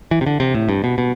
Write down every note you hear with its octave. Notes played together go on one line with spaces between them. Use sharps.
E3
C3
D3
C3
A2
G2
B2
B2